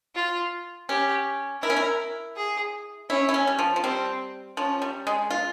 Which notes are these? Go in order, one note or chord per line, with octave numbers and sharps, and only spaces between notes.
F4
C#4 G4
E4 A#4
C#4
E4
G#4
C#4 E4
E4
C#4
G3
F3
F3
G3 C4
F3 C#4
G3
G#3
F4